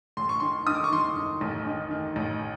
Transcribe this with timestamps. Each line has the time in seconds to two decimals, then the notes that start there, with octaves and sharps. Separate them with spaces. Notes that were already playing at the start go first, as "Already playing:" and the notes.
0.17 A1 C6
0.29 C#6
0.40 D#3 C6
0.67 D#3 D#6
0.75 D6
0.84 C#6
0.92 D#3 C6
1.17 D#3
1.41 A1
1.66 D#3
1.91 D#3
2.16 A1